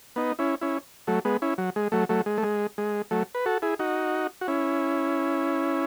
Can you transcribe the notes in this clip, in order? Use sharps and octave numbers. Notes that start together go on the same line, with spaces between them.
B3 D#4
C#4 E4
C#4 E4
F#3 A3
G#3 B3
C#4 E4
F#3
G#3
F#3 A3
F#3 A3
G#3
A3
G#3
G#3
F#3 A3
B4
F#4 A4
E4 G#4
D#4 F#4
F#4
C#4 E4